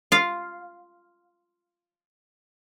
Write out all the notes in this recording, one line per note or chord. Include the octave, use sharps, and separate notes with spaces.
F4 F5